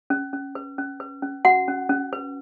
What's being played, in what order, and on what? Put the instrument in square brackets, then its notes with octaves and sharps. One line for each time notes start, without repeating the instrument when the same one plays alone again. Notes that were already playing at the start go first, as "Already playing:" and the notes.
[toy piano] C#4
C#4
B4
C#4
B4
C#4
F#4 F#5
C#4
C#4
B4